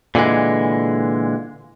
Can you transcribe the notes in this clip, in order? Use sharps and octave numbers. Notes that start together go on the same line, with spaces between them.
A#2 D3 E3 G#3